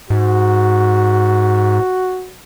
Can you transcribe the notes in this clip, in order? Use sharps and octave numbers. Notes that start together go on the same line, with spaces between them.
G#2 F#4